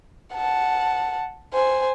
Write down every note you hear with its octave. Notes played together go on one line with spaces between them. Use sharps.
F#5 A5
C5 G#5